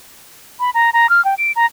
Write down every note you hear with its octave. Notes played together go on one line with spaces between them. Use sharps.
B5
A#5
A#5
F6
G5
D7
A#5